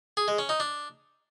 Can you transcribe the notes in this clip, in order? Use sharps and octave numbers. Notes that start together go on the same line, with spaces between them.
G#4
G#3
C#4
D#4
D4